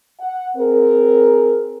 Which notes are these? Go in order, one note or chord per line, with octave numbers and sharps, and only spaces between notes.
F#5
C4 G#4 A#4